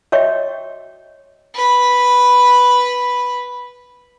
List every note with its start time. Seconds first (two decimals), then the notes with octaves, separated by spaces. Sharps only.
0.12 F#4 C#5 D#5 E5 G5 C#6
1.54 B4 B5